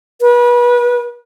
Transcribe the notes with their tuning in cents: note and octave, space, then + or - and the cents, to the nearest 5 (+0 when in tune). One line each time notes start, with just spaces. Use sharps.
B4 -30